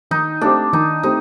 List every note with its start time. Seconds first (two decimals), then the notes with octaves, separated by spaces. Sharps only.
0.11 D#3 D#4
0.41 A3 C4 D4 G4 C5
0.73 D#3 D#4
1.03 A3 C4 D#4 G4 C5